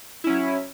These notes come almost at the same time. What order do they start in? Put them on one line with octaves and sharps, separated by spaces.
E4 C#4 F#3